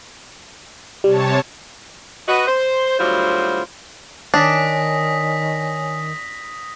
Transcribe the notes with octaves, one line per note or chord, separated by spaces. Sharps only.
C3 G3 C#5 A5
F#4 B4 D#5
C5
D2 F#3 G3 E4 F4 C5
D#3 D4 C#5 G#5 D#6 A#6 B6